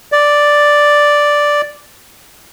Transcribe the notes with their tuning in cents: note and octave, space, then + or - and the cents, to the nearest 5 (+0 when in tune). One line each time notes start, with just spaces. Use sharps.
D5 +0